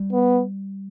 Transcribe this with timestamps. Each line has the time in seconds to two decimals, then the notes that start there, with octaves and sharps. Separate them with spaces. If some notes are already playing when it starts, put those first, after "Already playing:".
Already playing: G3
0.13 B3